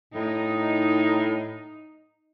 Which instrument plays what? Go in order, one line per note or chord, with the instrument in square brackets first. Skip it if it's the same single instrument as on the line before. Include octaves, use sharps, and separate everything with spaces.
[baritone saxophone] A2 [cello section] D#4